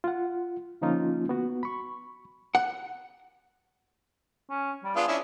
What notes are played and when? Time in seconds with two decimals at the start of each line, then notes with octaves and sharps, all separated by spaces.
0.04 F4 F#5
0.82 D3 F3 A#3 C#4 D#4 F4
1.29 B3 F#4
1.63 B5 C#6
2.55 F#5
4.50 C#4
4.84 G3
4.96 B3 D4 F4 G#4
5.08 C#4 D4 E4